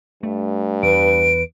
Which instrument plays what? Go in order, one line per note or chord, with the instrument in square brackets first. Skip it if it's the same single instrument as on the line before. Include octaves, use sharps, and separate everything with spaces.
[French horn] G2 [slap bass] A3
[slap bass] E2 [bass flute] B4 [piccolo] D7